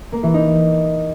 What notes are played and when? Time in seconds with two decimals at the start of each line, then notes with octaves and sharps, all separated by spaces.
0.12 A#3
0.23 E3
0.34 D#4